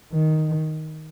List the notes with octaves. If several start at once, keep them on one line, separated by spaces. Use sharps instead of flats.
D#3